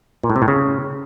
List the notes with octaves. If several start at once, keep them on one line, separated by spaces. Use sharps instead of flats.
A#2
A2
C3
A2
C#3